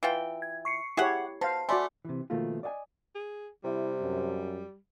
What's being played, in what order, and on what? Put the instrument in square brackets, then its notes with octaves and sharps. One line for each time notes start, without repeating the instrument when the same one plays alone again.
[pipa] E3 F4 G5
[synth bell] G#6
C#6 C7 C#7
[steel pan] E4 G4 C#5 [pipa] G#4 E5 F#5
[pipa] B2 [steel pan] C5 F5 [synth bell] A5
[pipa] A3 [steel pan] F#4 D5 B5 [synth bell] G#5 C6
[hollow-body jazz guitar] C3 E3
B2 D#3 F3 A3 A#3 F4
D5 D#5 F5 G#5
[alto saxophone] G#4
[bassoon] C3 [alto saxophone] G3 [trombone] E4
[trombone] F#2